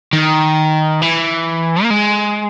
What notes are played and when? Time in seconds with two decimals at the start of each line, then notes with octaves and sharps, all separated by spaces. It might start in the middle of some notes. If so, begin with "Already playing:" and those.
0.13 D#3
1.02 E3
1.83 A#3
1.90 G#3